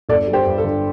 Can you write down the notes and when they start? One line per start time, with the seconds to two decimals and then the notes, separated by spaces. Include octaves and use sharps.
0.09 G1 A4 D5
0.28 G3
0.33 G4 C5
0.46 G2
0.58 A4
0.64 D3